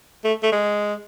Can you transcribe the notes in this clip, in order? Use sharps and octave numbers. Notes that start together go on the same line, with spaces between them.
A3
A3
G#3